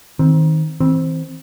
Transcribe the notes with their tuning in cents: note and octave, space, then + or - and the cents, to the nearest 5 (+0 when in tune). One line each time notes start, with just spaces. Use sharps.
D#3 +20 C4 +0
E3 -40 C4 +0